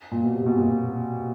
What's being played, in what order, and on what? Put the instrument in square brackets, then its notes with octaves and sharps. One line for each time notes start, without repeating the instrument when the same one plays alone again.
[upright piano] A#2
B2
C3
B2
A#2